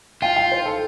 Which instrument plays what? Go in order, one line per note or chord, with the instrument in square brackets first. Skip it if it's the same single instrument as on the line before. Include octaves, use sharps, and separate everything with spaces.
[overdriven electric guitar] F4 [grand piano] G5
[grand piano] G5
C5
A4